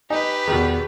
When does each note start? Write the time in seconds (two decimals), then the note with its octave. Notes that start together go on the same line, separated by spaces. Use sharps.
0.10 D#4 G4 B4 G#5
0.48 E2 B2 D#3 G#4